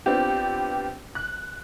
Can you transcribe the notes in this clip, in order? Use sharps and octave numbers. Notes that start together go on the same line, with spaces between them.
B3 C4 D4 F4 G4
F#6